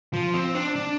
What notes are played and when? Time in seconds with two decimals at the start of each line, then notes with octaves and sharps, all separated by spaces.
0.13 F3
0.34 C4
0.55 D4
0.76 D4